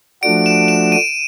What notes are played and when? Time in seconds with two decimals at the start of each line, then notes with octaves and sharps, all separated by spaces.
0.23 F3 A3 D4 F#4 D7
0.46 E7
0.68 E7
0.92 D#7